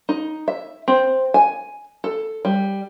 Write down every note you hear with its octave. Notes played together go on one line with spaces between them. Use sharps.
D#4
E5
C4
G#5
A4
G3